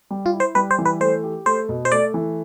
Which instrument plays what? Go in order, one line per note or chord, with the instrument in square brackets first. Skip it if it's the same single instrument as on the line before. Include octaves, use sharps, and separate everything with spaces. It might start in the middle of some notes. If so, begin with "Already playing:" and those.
[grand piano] G3
[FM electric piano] F4
[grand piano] E4
[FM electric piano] C5
[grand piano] G3 [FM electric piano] B4
[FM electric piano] C5
[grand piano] E3
[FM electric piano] B4
[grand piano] A3 [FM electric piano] C5
[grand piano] G4
[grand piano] A3 [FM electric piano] C5
[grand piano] B2
[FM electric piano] C5
[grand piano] A3 [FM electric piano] D5
[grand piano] E3